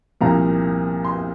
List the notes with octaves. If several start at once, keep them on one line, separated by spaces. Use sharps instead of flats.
C2 A#2 F3 A#5
C6